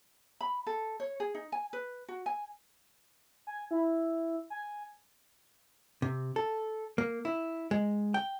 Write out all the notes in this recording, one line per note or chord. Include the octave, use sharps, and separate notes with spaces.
B5
A4
C#5
G#4
D#4
G#5
B4
F#4
G#5
G#5
E4
G#5
C3
A4
A#3
E4
G#3
G5